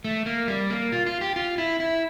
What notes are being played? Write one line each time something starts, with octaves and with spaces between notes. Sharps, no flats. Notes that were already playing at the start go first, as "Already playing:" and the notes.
A3
A#3
G3
A#3
F4
F4
G4
F4
E4
E4